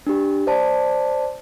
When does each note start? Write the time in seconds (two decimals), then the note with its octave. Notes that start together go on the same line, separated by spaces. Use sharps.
0.07 D4 G4
0.47 C5 D5 A5